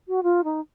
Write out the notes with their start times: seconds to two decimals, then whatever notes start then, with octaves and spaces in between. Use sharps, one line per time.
0.08 F#4
0.23 F4
0.44 D#4